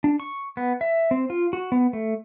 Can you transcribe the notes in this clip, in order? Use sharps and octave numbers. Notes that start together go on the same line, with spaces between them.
D4
C#6
B3
E5
C4
F4
F#4
B3
A3